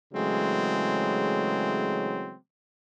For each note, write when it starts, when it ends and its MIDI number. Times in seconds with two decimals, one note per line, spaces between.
0.13 2.35 49
0.13 2.35 52
0.13 2.35 54
0.13 2.35 56
0.13 2.35 57
0.13 2.35 60